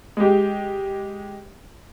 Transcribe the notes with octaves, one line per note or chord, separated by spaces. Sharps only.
G#3 G4